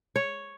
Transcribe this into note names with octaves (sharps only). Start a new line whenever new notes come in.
C#5